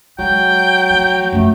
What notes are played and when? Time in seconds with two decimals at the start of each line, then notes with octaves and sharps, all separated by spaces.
0.19 F#3 G#3 G5
0.90 F3 A3
1.32 F#2 F3 A3